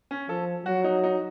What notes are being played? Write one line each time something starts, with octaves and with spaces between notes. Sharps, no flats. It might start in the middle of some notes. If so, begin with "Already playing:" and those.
C#4
F3 A4
F#3 F#4
D#4
D#4